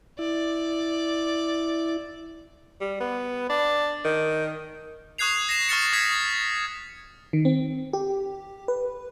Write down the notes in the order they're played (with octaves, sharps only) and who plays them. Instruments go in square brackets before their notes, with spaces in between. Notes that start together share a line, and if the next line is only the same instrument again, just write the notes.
[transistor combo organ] E4 [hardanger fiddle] D5
[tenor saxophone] G3
B3
D4
D#3
[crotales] C#6 D#6 F#6 G#6 C7 F7
A#6 C7 E7
C#6 F6 A6 C#7
D#6 G#6 B6
[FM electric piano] D#3
C4
G4
B4